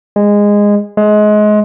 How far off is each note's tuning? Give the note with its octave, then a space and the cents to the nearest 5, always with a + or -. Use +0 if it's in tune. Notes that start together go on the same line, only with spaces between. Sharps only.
G#3 -15
G#3 +25